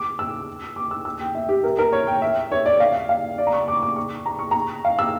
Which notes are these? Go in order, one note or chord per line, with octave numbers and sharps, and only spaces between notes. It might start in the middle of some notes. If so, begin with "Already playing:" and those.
Already playing: D6
E6
D6
E6
E6
G5
E5
G4
A#4
A#4
C#5
G5
E5
C#5
D5
F5
F5
D5
A#5
C#6
D6
D6
C#6
A#5
C#6
A#5
F5
E6